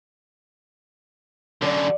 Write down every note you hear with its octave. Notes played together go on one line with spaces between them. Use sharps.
F#2 D3 D5